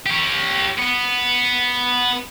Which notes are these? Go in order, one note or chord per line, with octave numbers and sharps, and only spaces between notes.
G4 C#5
B3